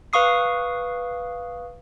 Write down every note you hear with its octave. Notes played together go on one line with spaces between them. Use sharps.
B4 F5 C#6 D#6 C7